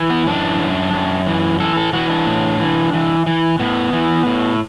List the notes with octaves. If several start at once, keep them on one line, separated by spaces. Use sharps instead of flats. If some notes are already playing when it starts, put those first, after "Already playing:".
Already playing: E3
B3
F#2 D4
F#2
F#2
E3
E3 A4
A4
E3 F#4
D4
A2
E3
E3
E3
A2 B3
E3
A2